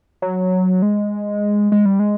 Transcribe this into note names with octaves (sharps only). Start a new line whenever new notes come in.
F#3
G#3
G#3
G3
G#3